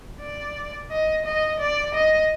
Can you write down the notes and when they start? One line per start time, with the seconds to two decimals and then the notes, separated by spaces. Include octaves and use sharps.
0.21 D5
0.91 D#5
1.25 D#5
1.60 D5
1.94 D#5